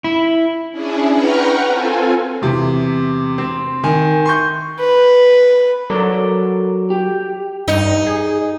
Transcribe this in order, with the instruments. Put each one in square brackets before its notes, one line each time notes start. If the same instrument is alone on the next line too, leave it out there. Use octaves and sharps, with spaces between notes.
[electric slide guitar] E4
[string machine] C#4 D4 E4 G#4
B4 F#5 G5 A#5 C#6 F6
C4 F4 A4 G#5
[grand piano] E2 C3
C4
D#3 G#5
C6 C#6 G6
[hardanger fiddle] B4
[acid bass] F#3 [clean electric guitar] A4 A#4 D5
[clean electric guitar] G4
[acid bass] G2 [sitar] D#4
[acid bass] G#4